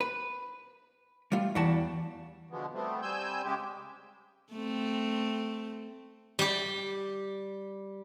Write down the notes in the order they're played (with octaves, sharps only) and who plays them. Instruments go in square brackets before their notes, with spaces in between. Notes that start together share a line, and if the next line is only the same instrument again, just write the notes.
[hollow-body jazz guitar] B4
G3 A3 F4
[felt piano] E2 [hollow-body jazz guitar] G3 F#4 A5
[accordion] B2 D3 F3 G#3 B3
G3 A3 B3 C4
G3 C4 G#5 E6 G6
C#3 G#3 G4
[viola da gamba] A3 C4
[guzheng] G3 G4